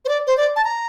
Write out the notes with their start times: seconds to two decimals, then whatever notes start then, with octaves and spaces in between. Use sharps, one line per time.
0.05 C5
0.09 D5
0.27 C5
0.37 D5
0.56 A5
0.64 A#5